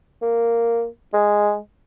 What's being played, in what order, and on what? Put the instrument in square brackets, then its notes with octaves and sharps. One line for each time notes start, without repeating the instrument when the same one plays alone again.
[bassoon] A#3
G#3